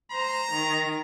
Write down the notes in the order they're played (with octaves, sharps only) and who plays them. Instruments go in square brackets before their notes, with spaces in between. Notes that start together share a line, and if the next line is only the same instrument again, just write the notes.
[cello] C5 [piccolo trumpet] A#5
[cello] D#3